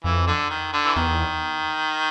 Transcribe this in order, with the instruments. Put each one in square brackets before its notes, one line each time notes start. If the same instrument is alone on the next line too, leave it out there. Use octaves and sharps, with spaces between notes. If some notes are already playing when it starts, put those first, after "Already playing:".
[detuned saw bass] F2 [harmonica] E3
[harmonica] D3
D#3
D3
E3
[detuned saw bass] E2 [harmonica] D#3